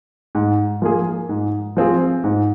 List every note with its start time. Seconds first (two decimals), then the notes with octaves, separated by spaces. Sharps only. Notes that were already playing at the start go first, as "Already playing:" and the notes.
0.35 G#2
0.82 F3 A#3 G#4
1.29 G#2
1.77 F3 C4 F4 G#4
2.24 G#2